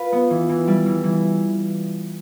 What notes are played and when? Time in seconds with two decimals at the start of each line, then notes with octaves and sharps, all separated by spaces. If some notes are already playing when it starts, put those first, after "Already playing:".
Already playing: F4 B4
0.12 B3
0.30 E3
0.49 E3
0.68 G3
0.86 E3
1.04 E3